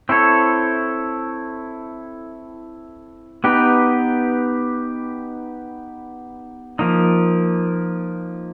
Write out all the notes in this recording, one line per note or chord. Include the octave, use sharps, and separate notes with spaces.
C4 E4 A4 C#5
B3 D#4 G4 B4
F3 A#3 D#4